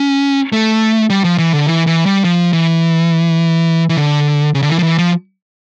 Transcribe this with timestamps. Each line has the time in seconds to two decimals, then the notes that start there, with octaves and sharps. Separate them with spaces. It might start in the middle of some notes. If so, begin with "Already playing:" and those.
Already playing: C#4
0.53 A3
1.10 G3
1.24 F3
1.38 E3
1.53 D3
1.67 E3
1.87 E3
2.06 G3
2.24 F3
2.53 E3
3.89 E3
3.97 D3
4.54 C#3
4.62 D3
4.69 E3
4.79 F3
4.83 E3
4.98 F3